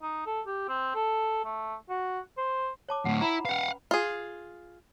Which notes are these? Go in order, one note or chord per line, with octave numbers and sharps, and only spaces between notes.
D#4
A4
G4
C4
A4
A3
F#4
C5
C#5 A5 D6
D2 A2 F#5
E4 A#5 B5
C#4 B4 F5 F#5
F4 G#4